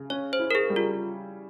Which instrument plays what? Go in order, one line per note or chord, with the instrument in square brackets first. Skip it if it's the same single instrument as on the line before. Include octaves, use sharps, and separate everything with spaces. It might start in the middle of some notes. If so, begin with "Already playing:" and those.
Already playing: [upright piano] C#3
[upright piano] C#4 [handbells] C#5
[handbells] C5
[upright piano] E4
[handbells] A#4
G#4
[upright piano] G3
[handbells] F4